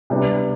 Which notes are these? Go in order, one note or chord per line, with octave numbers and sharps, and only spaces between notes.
C3 G3 B3 D4